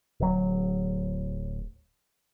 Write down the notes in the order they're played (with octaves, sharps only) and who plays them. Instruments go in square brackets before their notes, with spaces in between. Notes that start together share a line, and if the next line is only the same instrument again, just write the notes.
[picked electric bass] D1 F#3